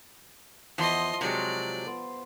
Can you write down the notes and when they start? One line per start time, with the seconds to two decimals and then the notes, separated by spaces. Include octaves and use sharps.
0.78 E2 F3 D#5 C6
1.21 C3 F#3 G#3 D5
1.87 B3 C5